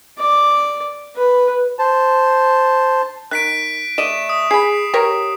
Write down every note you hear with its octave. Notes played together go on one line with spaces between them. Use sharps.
D5
B4
C5 A5
D#3 F#6 B6 D7
A3 D5 D#5 E7
D#6
G#4 B5 C7
G4 A#4 C#5